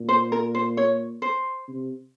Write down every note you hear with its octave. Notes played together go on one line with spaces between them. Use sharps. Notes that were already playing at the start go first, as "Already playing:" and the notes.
Already playing: A#2
C5
A#4
C5
C#5
C5
C3